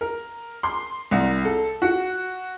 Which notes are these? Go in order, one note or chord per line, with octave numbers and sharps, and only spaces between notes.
A#4
C6
C2
A4
F#4